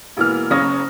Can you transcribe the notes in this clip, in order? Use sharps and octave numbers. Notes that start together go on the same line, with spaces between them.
E1 E3 A#3 F6
F#1 C#3 C#4 D#6 A#6